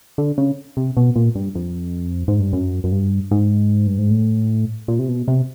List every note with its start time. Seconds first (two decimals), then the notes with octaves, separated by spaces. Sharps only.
0.18 D3
0.38 C#3
0.77 C3
0.97 B2
1.16 A#2
1.35 G2
1.55 F2
2.28 G#2
2.40 G2
2.53 F#2
2.84 F#2
2.92 G2
3.31 G#2
3.87 G2
3.98 G#2
4.10 A2
4.88 A#2
4.99 C3
5.09 B2
5.28 C3